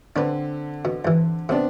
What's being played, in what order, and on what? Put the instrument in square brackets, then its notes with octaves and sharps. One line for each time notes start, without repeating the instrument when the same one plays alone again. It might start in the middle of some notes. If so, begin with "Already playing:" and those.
[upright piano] D3 C4 [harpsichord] D4 B4
[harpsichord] B2
G2 E3
[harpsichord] C3 [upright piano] B3 C4 D4